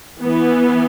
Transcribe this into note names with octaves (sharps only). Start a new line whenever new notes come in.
E3 B3